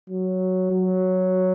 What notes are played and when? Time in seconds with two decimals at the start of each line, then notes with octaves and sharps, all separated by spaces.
0.10 F#3
0.72 F#3